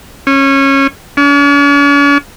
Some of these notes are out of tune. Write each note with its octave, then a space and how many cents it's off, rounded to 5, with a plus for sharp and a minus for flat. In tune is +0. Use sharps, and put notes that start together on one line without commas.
C#4 -20
C#4 +45